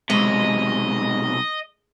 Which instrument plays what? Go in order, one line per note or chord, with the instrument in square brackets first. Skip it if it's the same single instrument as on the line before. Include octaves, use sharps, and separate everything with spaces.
[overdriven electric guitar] B1 C3 [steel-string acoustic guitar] G#3 [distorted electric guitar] D#5